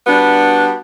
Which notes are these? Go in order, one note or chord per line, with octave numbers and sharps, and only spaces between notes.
G3 B3 D4 F#4